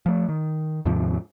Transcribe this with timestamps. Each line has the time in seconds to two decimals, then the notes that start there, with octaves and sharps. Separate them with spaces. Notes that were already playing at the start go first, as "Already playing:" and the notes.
0.06 F3 A3
0.29 D#3
0.85 D#2 G#2 C3 F3